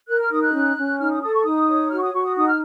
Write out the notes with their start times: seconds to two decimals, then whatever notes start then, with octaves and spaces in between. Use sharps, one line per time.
0.08 A#4 F#6
0.20 F6
0.31 D#4 D#6
0.42 F#6
0.54 C#4
0.77 C#4
1.00 D#4 F6
1.11 D#6
1.22 A4 D#6
1.34 C#6
1.45 D#4 D#6
1.68 C#5
1.90 F#4 F6
1.98 C#6
2.02 D#6
2.14 F#4 C#6
2.25 D#6
2.36 D#4 D#6
2.47 F6